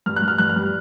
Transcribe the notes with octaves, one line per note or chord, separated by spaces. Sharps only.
G2 F6
F#6
G2
F6
G2 F#6
F6
G3